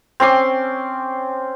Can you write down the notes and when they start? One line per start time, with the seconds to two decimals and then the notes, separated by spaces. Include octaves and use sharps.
0.20 C4 C#4 C6 D6